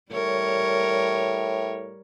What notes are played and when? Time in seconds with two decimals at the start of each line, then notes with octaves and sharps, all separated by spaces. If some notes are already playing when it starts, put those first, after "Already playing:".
0.12 A2 G3 A#4 C#5